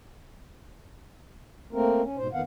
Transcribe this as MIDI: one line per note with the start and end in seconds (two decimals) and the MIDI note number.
1.73 2.02 57
1.73 2.02 58
1.73 2.02 60
1.73 2.02 70
2.02 2.17 61
2.17 2.28 44
2.17 2.28 47
2.17 2.28 72
2.33 2.41 41
2.33 2.41 51
2.33 2.41 59
2.33 2.41 77
2.33 2.41 78